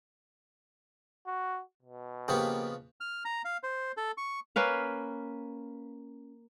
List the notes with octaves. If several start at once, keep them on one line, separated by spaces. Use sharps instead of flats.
F#4
B2
C#3 F3 A#3 B3 G4 G5
F6
A#5
F5
C5
A4
C#6
A#3 C#4 B4 F5